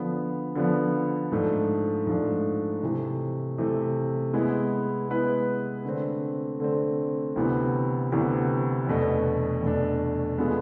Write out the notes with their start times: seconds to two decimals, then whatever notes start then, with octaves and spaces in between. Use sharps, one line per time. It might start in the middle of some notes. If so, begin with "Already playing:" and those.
Already playing: D3 F3 B3
0.55 D3 F3 B3
1.32 G#2 F3 A3 D4
2.07 G#2 F3 A3 D4
2.82 C3 E3 A3
3.58 C3 E3 A3
4.33 G#3 B3 E4 B4
5.09 G#3 B3 E4 B4
5.85 D3 A3 C4
6.60 D3 A3 C4
7.36 D2 C3 E3 B3
8.12 D2 C3 E3 B3
8.87 E2 B2 A3 D4
9.62 E2 B2 A3 D4
10.38 G#3 B3 D4 F4 A4